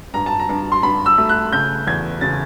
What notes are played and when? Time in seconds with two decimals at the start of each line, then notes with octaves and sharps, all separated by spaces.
0.14 G2 A#5
0.26 A5
0.39 A#5
0.49 G2
0.72 C6
0.83 G2 B5
1.06 E6
1.18 A3
1.29 F#6
1.53 C#3 G6
1.87 E2 G#6
2.21 C#3 A6